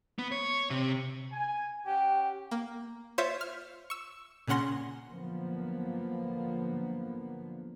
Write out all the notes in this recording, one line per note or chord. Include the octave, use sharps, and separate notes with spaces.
B3
C#5
C3
G#5
C#4 G4 F#5 G5
A#3
F4 C5 C#5 E5
F6
C#6 E6
A#2 C#3 C#4 F#5 C6 A#6
D3 F3 F#3 A#3 B3